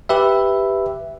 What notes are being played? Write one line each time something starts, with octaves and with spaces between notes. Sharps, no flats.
G4 B4 E5